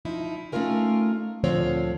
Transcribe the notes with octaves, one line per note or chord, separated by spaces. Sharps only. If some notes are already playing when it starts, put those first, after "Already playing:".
F3 D#4 E4
A3 C#4 D#4 F4 A#4 G#5
D2 A#2 D3 F3 C4 C#5